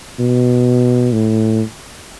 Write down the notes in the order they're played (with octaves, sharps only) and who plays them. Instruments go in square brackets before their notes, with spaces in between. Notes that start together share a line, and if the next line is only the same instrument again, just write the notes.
[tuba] B2
A2